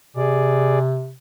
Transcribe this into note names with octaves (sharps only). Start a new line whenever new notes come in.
C3 G#4 D5